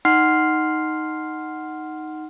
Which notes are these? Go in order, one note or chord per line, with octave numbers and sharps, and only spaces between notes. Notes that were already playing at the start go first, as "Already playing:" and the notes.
D#4 F#5 C6 F6 C7